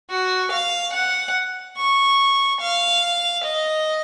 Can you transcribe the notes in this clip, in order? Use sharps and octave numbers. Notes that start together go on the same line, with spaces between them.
F#4
F5
F#5
C#6
F5
D#5